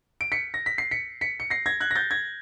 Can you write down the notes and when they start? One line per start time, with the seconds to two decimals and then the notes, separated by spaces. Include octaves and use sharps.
0.21 D7
0.32 B6 C#7
0.54 A#6
0.66 B6
0.78 C7
0.91 B6 C#7
1.21 B6 C#7
1.40 C#7
1.50 A#6 C7
1.66 G#6 A#6
1.80 F#6 G#6
1.91 A#6
1.96 G6 A6
2.11 G#6 A#6